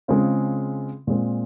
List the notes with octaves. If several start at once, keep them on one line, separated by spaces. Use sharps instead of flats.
C#3 G#3 C4 F4
A#2 G#3 C4